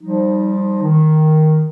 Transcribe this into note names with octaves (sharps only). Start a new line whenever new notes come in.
F3 G3 D#4
D#3